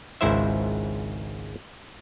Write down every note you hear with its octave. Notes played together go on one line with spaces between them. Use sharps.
G#1 C#2 G#2 E4 C5 E5